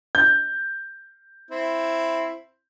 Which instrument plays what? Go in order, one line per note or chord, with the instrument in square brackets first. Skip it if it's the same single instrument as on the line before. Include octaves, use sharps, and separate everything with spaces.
[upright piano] G6
[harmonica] C4 E4